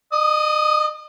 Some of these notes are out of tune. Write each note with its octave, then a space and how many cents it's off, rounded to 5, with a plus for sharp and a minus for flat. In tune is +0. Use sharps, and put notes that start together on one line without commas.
D#5 -35 D#6 +10